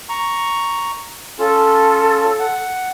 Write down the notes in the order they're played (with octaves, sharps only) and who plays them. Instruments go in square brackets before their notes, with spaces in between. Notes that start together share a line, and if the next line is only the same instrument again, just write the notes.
[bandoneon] A#5 C#6
[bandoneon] C#4 F4 [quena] A4
[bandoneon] F#5